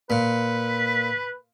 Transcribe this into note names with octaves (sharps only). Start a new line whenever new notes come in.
A#2 B4